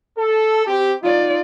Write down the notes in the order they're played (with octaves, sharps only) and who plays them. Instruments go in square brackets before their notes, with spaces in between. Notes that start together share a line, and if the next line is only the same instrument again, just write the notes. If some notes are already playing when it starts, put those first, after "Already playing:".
[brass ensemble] A4
C4 G4
[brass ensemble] D#4 [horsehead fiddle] F4 D5